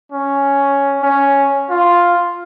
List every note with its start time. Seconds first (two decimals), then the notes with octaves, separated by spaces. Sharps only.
0.12 C#4
1.03 C#4
1.70 F4